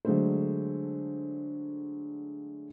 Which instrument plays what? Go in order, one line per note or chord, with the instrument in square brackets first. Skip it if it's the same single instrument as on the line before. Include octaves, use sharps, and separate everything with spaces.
[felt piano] D3 F#3 G#3 A3 D4 C5